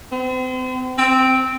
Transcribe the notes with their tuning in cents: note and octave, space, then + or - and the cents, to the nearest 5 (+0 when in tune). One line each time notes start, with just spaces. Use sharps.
C4 -40
C4 -5